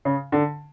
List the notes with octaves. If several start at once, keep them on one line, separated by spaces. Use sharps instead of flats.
C#3
D3